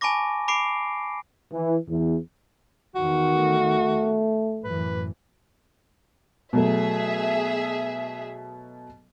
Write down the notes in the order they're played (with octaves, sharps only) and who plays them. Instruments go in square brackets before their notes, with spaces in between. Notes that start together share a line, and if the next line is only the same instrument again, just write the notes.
[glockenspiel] G#5 A5 B5 C#6 D6 A#6
B5 D6 C7 D7
[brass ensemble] E3
E2
[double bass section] E2 D#3 [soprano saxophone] F#4
[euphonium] A3
[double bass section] F#2 A2 E3 [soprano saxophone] B4
[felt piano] B2 F#3 A3 [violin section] G#4 E5